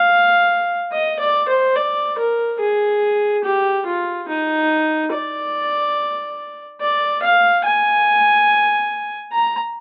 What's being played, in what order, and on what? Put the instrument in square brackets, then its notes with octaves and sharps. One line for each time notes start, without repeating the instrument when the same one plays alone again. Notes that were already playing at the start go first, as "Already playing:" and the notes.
Already playing: [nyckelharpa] F5
D#5
D5
C5
D5
A#4
G#4
G4
F4
D#4
D5
D5
F5
G#5
A#5